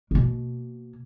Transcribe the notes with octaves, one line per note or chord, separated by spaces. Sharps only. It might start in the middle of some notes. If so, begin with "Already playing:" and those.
B2 A#3